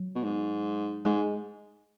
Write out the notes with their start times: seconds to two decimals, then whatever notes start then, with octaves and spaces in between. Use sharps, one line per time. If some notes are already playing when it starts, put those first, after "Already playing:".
Already playing: F#3
0.15 B2
0.24 G#2
1.05 G#2 G#3